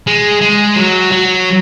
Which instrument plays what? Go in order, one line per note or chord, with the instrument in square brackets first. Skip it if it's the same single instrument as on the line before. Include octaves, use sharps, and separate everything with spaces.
[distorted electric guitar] G#3
G#3
F#3
F#3